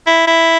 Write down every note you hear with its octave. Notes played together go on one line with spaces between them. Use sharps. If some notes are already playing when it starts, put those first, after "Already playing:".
E4
E4